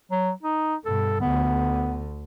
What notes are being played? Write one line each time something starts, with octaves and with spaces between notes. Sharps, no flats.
F#3
D#4
G2 B2 A4
D2 D3 B3